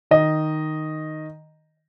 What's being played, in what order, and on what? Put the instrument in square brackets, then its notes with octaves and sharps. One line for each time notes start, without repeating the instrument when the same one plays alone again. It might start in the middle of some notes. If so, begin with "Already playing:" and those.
[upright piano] D#3 D#5